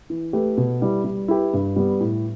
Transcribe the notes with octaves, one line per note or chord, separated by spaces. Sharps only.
E3
A3 G4 B4
B2
G3 E4 B4
G3
E4 G4 B4
G2
G3 B3
A2